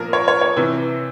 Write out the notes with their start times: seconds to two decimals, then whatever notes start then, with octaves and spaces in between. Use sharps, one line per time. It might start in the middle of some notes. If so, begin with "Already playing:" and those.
Already playing: A#2 F3 A#4
0.13 C#5
0.28 C#5
0.41 C#5
0.57 C3 E3